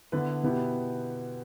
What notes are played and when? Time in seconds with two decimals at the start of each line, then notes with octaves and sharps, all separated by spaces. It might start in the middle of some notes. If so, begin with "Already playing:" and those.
0.12 D3 B3 E4 B4
0.43 B2 B3 E4 G4